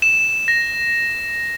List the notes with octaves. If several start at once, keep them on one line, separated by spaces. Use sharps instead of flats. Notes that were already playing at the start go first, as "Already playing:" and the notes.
E7
A#6